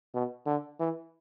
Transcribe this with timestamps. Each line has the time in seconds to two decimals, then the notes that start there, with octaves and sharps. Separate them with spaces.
0.14 B2
0.46 D3
0.80 E3